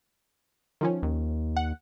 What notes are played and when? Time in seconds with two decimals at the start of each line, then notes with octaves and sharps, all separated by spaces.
0.81 D#3 F3 C#4
1.03 D#2
1.56 F#5